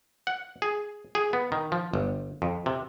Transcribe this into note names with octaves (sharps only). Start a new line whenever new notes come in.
F#5
G#4
G#4
B3
D#3
F3
G1
F2
C3